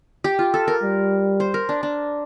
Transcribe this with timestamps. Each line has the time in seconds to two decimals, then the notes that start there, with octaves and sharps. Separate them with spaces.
0.24 G4
0.39 F4
0.54 A4
0.68 A#4
0.82 G3
1.40 C5
1.54 A#4
1.69 D4
1.83 D4